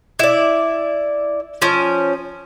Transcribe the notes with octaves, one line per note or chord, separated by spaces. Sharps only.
E4 D5
F3 C#4